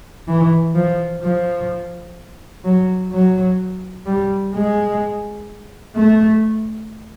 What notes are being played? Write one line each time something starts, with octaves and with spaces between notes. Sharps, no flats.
E3
F3
F3
F#3
F#3
G3
G#3
A3